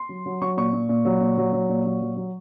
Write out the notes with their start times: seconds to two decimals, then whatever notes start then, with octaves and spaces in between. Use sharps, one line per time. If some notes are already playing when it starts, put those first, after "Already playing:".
Already playing: C6
0.09 F#3
0.26 F#3
0.41 F#3 C#6
0.57 A#2 C#6
0.73 A#2
0.89 A#2
1.05 F#3
1.21 A#2
1.37 F#3
1.53 F#3
1.69 A#2
1.85 F#3
2.01 F#3
2.17 F#3